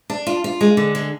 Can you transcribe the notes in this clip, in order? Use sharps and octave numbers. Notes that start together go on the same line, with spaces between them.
D4
F4
F4
G#3
D3
G#3